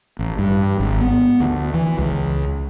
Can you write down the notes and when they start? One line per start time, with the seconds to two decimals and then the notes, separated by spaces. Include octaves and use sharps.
0.19 A1
0.39 G2
0.80 G#1
1.01 B3
1.40 D2
1.74 E3
1.99 C#2